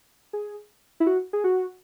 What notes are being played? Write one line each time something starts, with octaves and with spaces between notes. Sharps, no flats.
G#4
E4
F#4
G#4
F#4